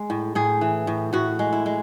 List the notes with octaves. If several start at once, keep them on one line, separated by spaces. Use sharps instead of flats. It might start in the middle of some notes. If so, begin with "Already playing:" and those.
Already playing: G#3
A2
A2 G#4
E3
A2
A2 F#4
G#3
E4
G#3